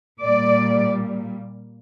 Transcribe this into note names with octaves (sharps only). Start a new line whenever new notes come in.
A#2 G3 A#3 D5